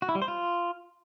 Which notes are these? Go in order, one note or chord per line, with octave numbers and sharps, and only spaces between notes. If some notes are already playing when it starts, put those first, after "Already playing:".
F#4
E4
G3
C5
F4